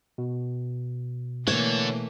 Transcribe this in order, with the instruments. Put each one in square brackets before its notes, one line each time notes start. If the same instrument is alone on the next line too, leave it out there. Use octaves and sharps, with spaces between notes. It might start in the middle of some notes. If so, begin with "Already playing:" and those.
[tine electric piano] B2
[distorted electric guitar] D3 [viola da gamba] E3 A3 A#3 [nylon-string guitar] C#5